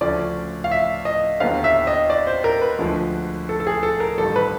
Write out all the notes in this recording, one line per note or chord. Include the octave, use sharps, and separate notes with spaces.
D2 C#3 F3 A3 C#4 D5
F5
E5
D#5
D#2 D3 F#3 B3 F5
E5
D#5
D5
C5
A#4
B4
D2 D3 F3 G#3
A4
A4
G#4
A4
A#4
A1 G2 D#3 G3 A4
B4